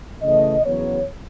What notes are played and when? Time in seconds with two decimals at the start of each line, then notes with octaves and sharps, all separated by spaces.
0.23 C#3 E3 A3 D#5
0.65 E2 C#3 F#3 B3 C#5